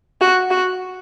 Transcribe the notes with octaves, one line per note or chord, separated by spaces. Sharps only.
F#4
F#4